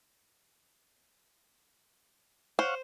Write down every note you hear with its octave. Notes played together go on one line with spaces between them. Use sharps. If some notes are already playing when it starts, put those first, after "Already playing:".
C5 C#5 F5 F#5